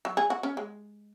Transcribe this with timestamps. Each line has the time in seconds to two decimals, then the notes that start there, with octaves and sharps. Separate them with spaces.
0.05 F#3
0.17 G#4
0.30 F#4
0.43 C#4
0.57 G#3